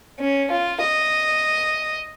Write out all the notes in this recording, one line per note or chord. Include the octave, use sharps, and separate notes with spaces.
C#4
F4
D#5